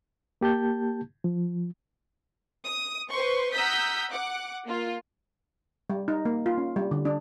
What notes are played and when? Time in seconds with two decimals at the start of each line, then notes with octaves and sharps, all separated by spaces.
0.41 A#3 G4 A5 G6
1.24 F3
2.65 D#6
3.10 B4 C5 C6 C#6
3.52 F#5 A#5 D#6 E6 G6 B6
4.11 F#5 D6
4.66 A#3 F4
5.90 G3
6.08 D#4
6.25 A#3
6.46 F4
6.58 C#4
6.76 G3
6.91 D3
7.05 D4